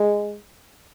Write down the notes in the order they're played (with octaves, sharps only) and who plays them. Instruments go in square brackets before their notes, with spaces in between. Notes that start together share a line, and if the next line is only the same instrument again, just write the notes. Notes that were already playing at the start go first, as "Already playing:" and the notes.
Already playing: [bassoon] G#3